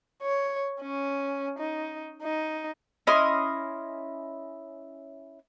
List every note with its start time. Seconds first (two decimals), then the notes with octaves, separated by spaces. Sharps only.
0.23 C#5
0.81 C#4
1.58 D#4
2.22 D#4
3.07 C#4 E4 D#5 C6